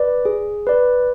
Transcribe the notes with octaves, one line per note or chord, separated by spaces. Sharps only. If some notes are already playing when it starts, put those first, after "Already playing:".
Already playing: B4 D5
G#4
B4 D5